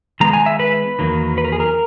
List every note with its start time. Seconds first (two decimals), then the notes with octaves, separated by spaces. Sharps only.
0.20 D#3 G#3 B3 A#5
0.33 G#5
0.46 E5
0.59 B4
0.99 E2 D#3 F#3 A#3
1.38 B4
1.45 A#4
1.52 G#4
1.60 A#4